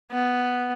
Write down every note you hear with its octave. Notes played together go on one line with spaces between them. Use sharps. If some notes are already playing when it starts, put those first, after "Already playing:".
B3